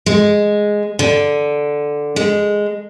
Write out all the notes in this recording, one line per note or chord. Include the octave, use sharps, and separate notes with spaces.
G#3
D3
G#3